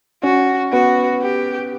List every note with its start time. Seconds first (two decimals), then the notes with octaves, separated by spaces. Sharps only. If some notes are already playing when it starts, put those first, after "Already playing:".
0.23 C#4 F#4
0.73 B3 F#4
1.22 G4